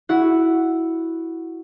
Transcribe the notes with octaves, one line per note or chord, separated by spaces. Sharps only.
E4 F#4 F#5